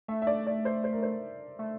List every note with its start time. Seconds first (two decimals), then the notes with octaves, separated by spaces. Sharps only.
0.08 A3 E5
0.22 E5
0.27 D5
0.47 D5
0.65 C5
0.84 C5
0.93 A#4
1.03 C5
1.59 A3